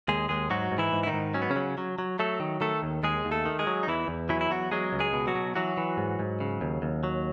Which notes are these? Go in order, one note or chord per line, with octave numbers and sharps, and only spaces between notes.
D#2 G#3 G#4
D#2 G#3 G#4
G#2 F#3 F#4
G#2
E3 E4
G#2
E4
D#3 D#4
G#2
F#3 C#4
B3
C#3 C#4
F#3
F#3
F#3
F#3 A3 A4
D#3
D#3 A3 A4
D#2
D#2 G#3 G#4
D#2
A3 A4
D#3
G#3 G#4
F#3
D#4
E2 E3 E4
E2
E3 F#3 E4
E4
E2 F#3 F#4
F#3 G#3 G#4
C#2
G#3 G#4
B2
F#3 F#4
B2
E3 F#3 F#4
E3
G#2
G#2
C#3
D#2
D#2
F#3